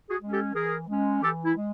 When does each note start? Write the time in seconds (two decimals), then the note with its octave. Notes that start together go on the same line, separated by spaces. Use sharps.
0.09 F#4 G#4
0.20 G#3 C#4
0.31 G4 A4
0.54 E3 G#4 A#4
0.88 G#3 C#4
1.22 E3 G4 A4
1.45 E4
1.55 G#3